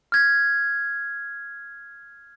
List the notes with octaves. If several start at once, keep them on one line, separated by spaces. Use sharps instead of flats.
F6 G#6